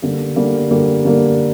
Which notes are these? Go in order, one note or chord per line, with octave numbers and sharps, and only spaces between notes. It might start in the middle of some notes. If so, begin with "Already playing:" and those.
D3 G3 A#3
D3 G3 A#3
D3 G3 A#3
D3 G3 A#3